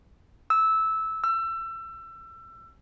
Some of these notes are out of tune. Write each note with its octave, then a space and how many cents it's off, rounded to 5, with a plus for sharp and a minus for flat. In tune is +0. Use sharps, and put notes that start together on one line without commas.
E6 -15
E6 +25